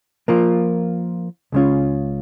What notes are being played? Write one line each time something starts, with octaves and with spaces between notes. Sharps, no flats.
F3 A#3 F4 A#4
C#2 C#3 G#3 C#4 F4